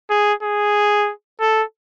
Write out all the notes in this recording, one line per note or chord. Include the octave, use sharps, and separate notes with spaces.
G#4
G#4
A4